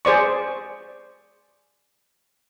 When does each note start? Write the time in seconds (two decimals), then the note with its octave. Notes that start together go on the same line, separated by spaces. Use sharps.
0.05 G#4 C5 D5 C#6